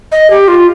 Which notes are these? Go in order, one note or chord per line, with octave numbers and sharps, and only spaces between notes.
D#5
G4
F4